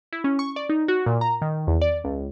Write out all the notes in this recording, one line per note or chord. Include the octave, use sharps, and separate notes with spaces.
E4
C#4
C#6
D5
D#4
F#4
A#2
A#5
D#3
E2
D5
C#2